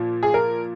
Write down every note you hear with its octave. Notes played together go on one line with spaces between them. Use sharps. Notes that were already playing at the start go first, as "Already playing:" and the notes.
Already playing: A#2 F3
G#4
A#4